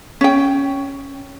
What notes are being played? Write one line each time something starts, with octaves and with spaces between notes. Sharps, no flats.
C#4 G5